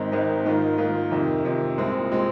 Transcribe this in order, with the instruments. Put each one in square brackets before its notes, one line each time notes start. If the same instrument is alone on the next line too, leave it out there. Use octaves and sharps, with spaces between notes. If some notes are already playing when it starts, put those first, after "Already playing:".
Already playing: [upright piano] G#1 G#2 D#3 C4
G#1 G#2 D#3 C4
G#2 D#3 A#3 F4
G#2 D#3 A#3 F4
F2 C3 D#3
F2 C3 D#3
C2 A#2 G#3 C4
A#2 G#3 C4